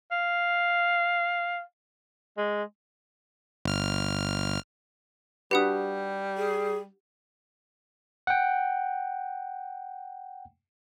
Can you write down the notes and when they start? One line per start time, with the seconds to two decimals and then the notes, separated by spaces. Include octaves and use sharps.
0.11 F5
2.37 G#3
3.65 G1 F6
5.51 G3 D4 F#4 G4 B4 F#5 D#6
6.37 G#4
8.27 F#5 G5